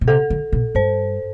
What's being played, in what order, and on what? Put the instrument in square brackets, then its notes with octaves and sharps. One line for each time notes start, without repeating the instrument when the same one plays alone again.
[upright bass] B2
[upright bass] C3 [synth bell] A4
[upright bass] D3
B2
[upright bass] G2 [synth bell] C5